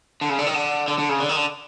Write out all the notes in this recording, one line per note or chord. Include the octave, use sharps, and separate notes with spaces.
D3
C#3
D3
D#3
D3
D3
D3
C#3
D3
D#3
D3